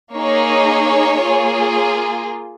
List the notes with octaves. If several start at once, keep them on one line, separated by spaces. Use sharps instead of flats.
A#3 D#4 G#4 C#5
A#3 F4 G#4